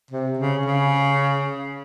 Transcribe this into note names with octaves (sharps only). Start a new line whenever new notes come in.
C3
C#3
C#3